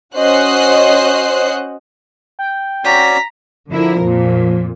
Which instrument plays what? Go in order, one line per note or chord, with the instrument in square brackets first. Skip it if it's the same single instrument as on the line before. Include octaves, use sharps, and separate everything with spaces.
[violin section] C#4 F#4 C5 D#5 F#6 C7
[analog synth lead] G5
[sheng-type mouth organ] C#4 F#4 D5 [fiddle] A#5 [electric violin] B6
[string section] D3 E4 A#4 [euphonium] F3
[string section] F2 A#2